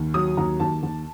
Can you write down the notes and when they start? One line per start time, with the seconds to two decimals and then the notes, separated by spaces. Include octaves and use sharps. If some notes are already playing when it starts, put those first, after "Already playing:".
Already playing: D#2
0.14 F#3 D#6
0.37 D#2 A#5
0.60 D#2 A5
0.83 D#2